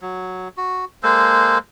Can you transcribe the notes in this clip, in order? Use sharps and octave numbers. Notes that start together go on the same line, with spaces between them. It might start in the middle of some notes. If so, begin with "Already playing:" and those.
F#3
F#4
G#3 A#3 A4 C5